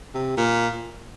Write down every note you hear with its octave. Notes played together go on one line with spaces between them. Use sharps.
C3
A#2